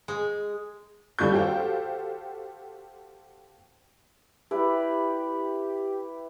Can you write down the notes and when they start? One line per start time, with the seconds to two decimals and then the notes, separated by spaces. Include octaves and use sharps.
0.08 G#3
1.19 D#2 G3 A4 C#6 G6
1.33 F#4 G4 A4 C5 F5 G5
4.51 E4 G4 B4 D5